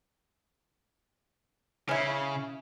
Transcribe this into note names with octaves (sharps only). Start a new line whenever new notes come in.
C#3 C#4 E4